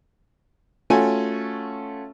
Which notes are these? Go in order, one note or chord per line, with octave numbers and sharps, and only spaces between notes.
A3 C#4 F4 F#4 G#5